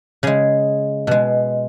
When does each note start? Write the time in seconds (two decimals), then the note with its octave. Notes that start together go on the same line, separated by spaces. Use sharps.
0.23 C#3 G#3 G#4
1.07 B2 G#3